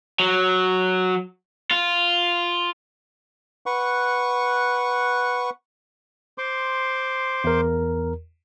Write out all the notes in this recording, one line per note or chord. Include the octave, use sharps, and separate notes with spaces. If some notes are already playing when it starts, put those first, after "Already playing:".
F#3
F4
B4 F#5 C#6
C5 C6 D6
E2 A#4